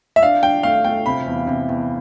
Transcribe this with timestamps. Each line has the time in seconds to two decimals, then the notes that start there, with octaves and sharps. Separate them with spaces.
0.16 E5
0.22 D4 F5
0.43 D4 G5
0.63 A3 F5
0.84 A3 G5
1.06 C3 B5
1.26 E2
1.47 C3
1.69 E2